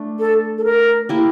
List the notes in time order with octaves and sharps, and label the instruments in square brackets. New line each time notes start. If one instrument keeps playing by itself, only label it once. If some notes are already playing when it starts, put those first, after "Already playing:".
Already playing: [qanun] A3 D4
[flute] A4
A4
A#4
[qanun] A#3 E4 G4 A#4